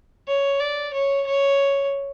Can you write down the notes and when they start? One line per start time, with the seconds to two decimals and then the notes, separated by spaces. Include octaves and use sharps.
0.28 C#5
0.60 D5
0.94 C#5
1.27 C#5